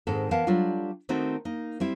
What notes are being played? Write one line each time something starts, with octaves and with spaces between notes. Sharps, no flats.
G#2 D#3 C4 A4
E3 B3 A#4 F5 F#5 A5
F#3 G3 D4 F4 A4
D#3 A3 C4 D#4 F#4 A4
A#3 D#4
G3 C4 E4